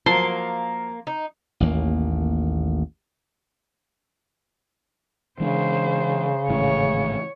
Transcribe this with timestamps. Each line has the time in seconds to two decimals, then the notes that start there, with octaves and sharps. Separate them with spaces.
0.06 F3 F#3 A#3 A5 C6
1.07 D#4
1.60 A1 D#2 A#3
5.40 C#3 E3 G#3 D4 C5
6.49 G#1 A2 E3 C#5